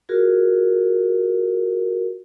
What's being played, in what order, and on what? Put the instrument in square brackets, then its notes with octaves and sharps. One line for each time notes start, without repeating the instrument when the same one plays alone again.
[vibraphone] F4 F#4 G#4 A#4